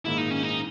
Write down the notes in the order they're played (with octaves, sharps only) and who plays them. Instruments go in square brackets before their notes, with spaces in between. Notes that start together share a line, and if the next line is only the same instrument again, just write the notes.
[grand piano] A#1 G#2 D#3 A#3 [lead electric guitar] E4
[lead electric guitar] D#4
C#4
D#4